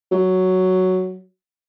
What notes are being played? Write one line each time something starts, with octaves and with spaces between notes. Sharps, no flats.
F#3